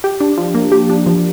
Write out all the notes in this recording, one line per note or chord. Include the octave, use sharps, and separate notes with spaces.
G4
D4
F3
A#3
G4
D4
F3